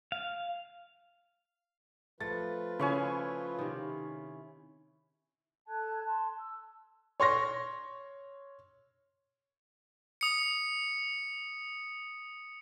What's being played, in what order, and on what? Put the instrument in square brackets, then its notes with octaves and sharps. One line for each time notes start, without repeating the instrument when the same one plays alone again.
[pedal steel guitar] F5
[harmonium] F3 F4 B4 [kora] A3 [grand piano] A6
[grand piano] C#3 [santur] E4 C#5 G#5
[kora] C3 D#3
[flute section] A4 A5 F#6 G#6
A5 C6
E6
[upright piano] C#5 C6 C#6 A#6
[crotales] D#6 C#7